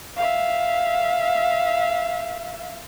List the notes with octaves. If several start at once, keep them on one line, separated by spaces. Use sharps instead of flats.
E5 F5